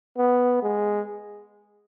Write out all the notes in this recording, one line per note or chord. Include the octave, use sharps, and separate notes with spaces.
B3
G#3